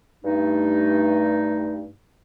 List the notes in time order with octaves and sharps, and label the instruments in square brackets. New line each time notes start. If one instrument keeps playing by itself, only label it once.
[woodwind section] G2 A3 D#4